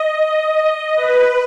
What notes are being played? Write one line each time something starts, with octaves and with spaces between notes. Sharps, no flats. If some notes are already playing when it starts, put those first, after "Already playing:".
Already playing: D#5
B4